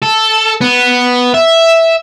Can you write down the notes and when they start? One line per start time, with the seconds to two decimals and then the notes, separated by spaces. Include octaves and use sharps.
0.03 A4
0.61 B3
1.34 E5